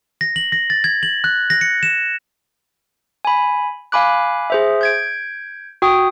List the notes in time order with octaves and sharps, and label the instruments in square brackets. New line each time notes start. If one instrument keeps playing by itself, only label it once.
[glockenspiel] A#6
F#7
A#6
A6
G#6
F#7
F#6
A#6
C#7
E7
[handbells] G#5 B5
F5 G#5 B5 D6 F#6
G#4 C5 E5
G6 G#6 D7
F#4 G5 D#6